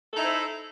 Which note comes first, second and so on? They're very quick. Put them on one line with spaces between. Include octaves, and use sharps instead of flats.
A4 D#4 E4 C5